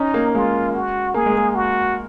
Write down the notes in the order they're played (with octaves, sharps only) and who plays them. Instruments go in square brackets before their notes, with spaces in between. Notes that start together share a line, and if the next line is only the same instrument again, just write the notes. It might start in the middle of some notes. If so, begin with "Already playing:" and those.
Already playing: [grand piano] C#4 [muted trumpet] D#4
[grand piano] A#3
[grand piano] G#3 [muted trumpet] F4
[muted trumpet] F#4
[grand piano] A#3 [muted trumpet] G#4
[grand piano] G#3
A#3
[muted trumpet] F#4